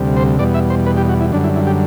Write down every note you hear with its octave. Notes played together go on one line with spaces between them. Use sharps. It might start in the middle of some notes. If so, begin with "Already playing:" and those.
Already playing: D2 C3 G3
C5
E2 B2 G3 D5
E5
C5
B4
G4
F#4
E4
F#2 D3 G3 D4
E4
E4
G4